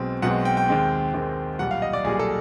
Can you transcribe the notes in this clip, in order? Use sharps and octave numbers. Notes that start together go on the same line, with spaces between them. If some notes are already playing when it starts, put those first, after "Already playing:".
Already playing: B1 B2 G#3 C4
B1 B2 G#3 C4 F#5
G5
G5
D#2 D#3 G#3 C4
D#2 D#3 G#3 C4
B1 A#2 G3 F#5
F5
D#5
D5
B1 A#2 G3 G#4
A4